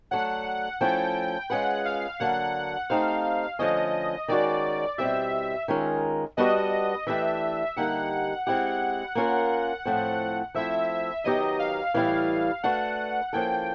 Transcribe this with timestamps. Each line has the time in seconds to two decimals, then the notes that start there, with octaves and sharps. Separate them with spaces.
0.11 F#3 A3 D4 F#5
0.81 F3 A3 C#4 E4 G5
1.50 G#3 C#4 F4 G#4 B4 F#5
1.85 F5
2.20 D3 F#3 A#3 D4 F#5
2.89 A3 C4 D#4 G4 C5 F5
3.59 D3 F3 A3 C#4 D#5
4.28 D#3 G#3 C#4 F#4 D5
4.98 B2 G3 C4 E4 G4 E5
5.68 D#3 G#3 C#4 F4 A#4
6.37 G3 B3 D4 F#4 B4 D#5
7.07 E3 A3 D4 G4 B4 E5
7.76 D3 G3 A#3 D#4 G4 F#5
8.46 G#3 C4 E4 G4 F#5
9.15 A#3 C#4 F4 A#4
9.85 A2 F3 A3 C4
10.55 F3 A3 C4 E4 E5
11.24 D#3 F#3 B3 D#4 G4 D#5
11.59 F5
11.94 A2 E3 G3 B3 E4 F5
12.63 A3 D4 F#4 B4 F#5
13.33 F3 A#3 C#4 E4 A4 G5